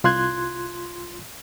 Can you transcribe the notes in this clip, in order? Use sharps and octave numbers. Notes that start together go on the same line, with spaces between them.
C2 F4 C6 F#6 G#6